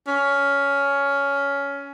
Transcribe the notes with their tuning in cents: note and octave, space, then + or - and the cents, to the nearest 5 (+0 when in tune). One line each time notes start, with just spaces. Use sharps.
C#4 +15